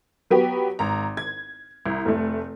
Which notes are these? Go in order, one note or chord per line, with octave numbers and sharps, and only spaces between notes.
F#3 B3 F#4 G4
G#1 A#5
G#6
C2
F1 A3